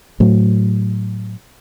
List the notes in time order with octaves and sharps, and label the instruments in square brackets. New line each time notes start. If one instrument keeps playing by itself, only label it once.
[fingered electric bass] A2 F#3